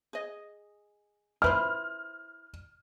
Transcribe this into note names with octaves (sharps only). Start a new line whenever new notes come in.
G#4 D#5
E4 B4 C5 F6